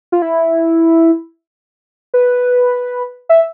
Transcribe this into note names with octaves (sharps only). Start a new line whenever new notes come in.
F4
E4
B4
E5